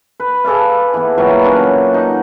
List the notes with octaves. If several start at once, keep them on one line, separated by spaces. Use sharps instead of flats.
B4
G#4 A4 D5 F5
E3 B3
A#2 E3 F#3 G3
C#4 D4
D#4 F#5